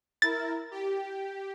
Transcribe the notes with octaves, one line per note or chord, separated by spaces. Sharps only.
E4 A#4 A6
G4